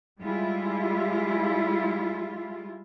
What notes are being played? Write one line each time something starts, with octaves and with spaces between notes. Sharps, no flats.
G3 G#3 E4 F4